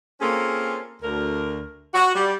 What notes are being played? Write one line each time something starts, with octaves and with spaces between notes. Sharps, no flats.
A#3 C4 C#4 F4 G#4 A4
D2 A#4
F#4
G3